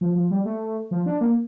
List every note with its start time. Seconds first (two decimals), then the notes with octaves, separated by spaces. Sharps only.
0.01 F3
0.16 F3
0.30 G3
0.45 A3
0.91 F3
1.06 D4
1.21 A#3